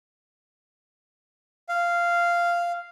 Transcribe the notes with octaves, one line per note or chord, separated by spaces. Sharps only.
F5